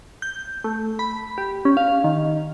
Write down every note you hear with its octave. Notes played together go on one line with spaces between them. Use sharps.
G6
A3
B5
G4
C#4
F5
D#3